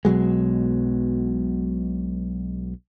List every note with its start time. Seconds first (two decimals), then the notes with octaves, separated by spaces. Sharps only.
0.05 B1 B2 F#3 G#3